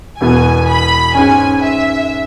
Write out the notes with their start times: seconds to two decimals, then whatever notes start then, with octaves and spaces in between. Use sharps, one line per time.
0.19 E1 E2 B2 B3 E4 G#5
0.68 B5
1.15 G#2 G#3 C#4 G#5
1.63 E5